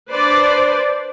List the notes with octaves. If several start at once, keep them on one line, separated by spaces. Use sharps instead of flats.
D4 B4 C5 D5